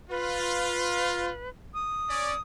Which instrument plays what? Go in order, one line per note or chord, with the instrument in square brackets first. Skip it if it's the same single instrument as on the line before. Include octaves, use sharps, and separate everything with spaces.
[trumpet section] F4 [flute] B4
[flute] D#6
[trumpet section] C#4 D5